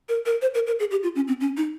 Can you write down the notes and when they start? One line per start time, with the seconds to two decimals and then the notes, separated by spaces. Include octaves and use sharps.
0.09 A#4
0.26 A#4
0.41 C5
0.54 A#4
0.67 A#4
0.79 G#4
0.91 G4
1.03 F4
1.15 C#4
1.28 C4
1.40 C#4
1.57 D#4